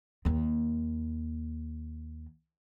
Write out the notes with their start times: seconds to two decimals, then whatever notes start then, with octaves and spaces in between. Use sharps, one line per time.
0.25 D#2 A#3